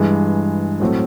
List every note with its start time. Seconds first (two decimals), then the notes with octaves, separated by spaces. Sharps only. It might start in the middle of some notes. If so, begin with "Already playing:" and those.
Already playing: G2 E3 G#3
0.80 A2 F#3 A3 C4